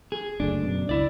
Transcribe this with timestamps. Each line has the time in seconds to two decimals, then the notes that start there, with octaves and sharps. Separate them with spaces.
0.12 G#4
0.40 F#1 D2 D3 D4
0.63 F#2 B2
0.89 C#2 E4 D5